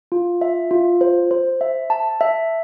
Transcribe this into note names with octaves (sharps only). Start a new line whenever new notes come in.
F4
E5
F4
C5
C5
E5
A5
E5